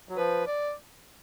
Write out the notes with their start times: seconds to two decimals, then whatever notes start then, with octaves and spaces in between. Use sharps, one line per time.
0.09 F#3
0.16 F3 B4
0.47 D5